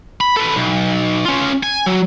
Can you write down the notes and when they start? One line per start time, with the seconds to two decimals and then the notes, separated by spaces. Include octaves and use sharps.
0.21 B5
0.37 A4 B4
0.56 B1
1.25 C#4 F4
1.63 G#5
1.86 F#3